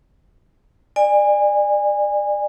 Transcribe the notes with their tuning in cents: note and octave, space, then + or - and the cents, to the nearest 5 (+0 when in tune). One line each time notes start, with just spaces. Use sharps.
D5 +25 G#5 -25